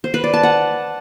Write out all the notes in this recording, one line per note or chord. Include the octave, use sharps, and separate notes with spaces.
C5
B4
D5
A5
F#5